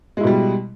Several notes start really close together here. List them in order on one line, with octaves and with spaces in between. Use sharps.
G#3 E4 B2 G3